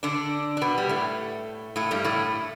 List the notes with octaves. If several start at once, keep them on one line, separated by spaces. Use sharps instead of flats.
D3 D4
D4
B2 B3
G3
A2 A3
A2 A3
G2 G3
A2 A3